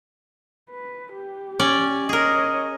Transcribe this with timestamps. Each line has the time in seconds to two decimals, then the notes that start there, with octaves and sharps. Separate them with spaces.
0.70 B4
1.14 G4
1.59 C#4 D5
2.09 G#4 A#4 C#5 D#5